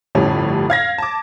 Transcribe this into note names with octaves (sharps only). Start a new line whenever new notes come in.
G1 F2 A2 G3 C#4
F5 G#6 A#6
A5 D6